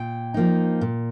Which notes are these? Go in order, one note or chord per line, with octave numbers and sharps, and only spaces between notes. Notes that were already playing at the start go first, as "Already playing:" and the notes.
Already playing: A#2 G5
F3 A#3 D#4
A#2